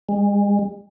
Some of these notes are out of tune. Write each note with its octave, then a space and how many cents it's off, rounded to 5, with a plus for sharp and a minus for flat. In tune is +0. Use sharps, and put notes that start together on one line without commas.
G#3 -40